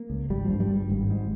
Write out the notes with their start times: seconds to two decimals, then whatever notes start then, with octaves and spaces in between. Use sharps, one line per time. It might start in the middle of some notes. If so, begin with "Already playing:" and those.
Already playing: A#3
0.10 C#2
0.30 G#1 G3
0.45 G2 F3
0.60 G3
0.70 G2
0.75 G3
0.90 G#1
1.10 G#2